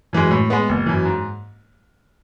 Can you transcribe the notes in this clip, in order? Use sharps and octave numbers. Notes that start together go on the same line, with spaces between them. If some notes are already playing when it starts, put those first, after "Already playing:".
F#2 E3 G#3
A2
G#3 B3
F#1
F#2 E3
G#2